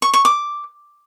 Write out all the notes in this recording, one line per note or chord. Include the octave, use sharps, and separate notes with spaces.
C#6
C#6
D6